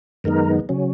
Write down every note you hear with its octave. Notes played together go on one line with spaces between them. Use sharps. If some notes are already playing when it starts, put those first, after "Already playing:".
F#2 D#3 G#3 B3 D#4 A#4
C#3 F#3 C#4